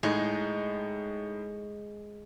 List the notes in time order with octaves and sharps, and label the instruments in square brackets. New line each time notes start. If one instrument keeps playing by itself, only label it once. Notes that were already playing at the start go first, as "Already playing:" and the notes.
[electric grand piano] A2 D#4 [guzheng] G#3